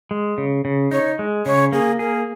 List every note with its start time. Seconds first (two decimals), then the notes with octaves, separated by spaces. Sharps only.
0.11 G#3
0.38 C#3
0.65 C#3
0.91 D#4 C#5
1.19 G#3
1.46 C#3 C#5
1.72 A#3 G#4
1.99 G#4 A#4